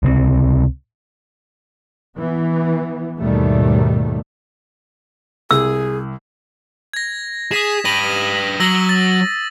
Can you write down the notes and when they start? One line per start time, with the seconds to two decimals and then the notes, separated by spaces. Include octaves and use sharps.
0.03 C#2 C3 G#3 C4
2.18 E3 B3
3.20 D#2 G#2 B2 D#3 G3 A3
5.51 C2 G#4 E6
6.93 G#6 A#6
7.51 G#4 D#6 B6 E7
7.85 G4 B4 A#6 D#7 F#7
8.60 F#3 E6 A#6 F#7
8.89 A6